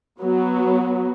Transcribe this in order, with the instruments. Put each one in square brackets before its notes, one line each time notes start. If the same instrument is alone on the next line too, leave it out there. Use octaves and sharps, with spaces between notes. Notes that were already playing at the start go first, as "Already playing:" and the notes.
[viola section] F#3 B3